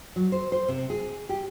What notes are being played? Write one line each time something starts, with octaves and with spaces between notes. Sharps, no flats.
F#3
C5
C5
C3
G#4
G4